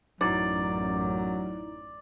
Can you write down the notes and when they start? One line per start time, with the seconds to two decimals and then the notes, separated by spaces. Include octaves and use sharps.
0.21 A1 F#2 F#3 D#4 E4 D5